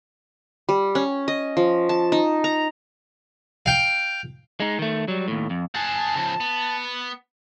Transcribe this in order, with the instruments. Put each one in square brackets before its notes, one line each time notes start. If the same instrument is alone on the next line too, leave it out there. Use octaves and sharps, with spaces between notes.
[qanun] G3
C#4
D#5
F3
A5
D#4
A#5
[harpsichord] F5 G5
[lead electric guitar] G#3 D#4
D#3 A3
F#3 G3
D#2 A2
F2
[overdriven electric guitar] G#4 F#5 [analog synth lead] A5
[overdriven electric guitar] C#3 F3
B3